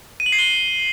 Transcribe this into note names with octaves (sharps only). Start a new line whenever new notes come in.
D#7
F#7
C7
G7